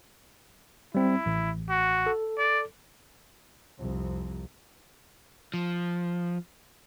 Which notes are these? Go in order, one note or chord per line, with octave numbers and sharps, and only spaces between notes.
G3 C4 E4
A1
F#4
A4
D5
C2 F2
F3